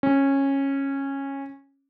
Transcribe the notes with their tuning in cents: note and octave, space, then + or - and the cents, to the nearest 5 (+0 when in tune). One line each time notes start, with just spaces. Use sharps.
C#4 -15